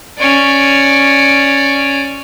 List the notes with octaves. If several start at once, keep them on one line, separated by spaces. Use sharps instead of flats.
C#4 D5